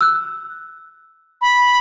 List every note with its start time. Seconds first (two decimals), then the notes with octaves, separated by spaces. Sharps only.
0.01 E6 F#6
1.41 B5